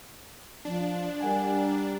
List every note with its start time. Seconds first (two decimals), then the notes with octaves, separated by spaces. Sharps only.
0.65 F3 D4
1.21 G3 A#4 F#5 G#5
1.58 A#5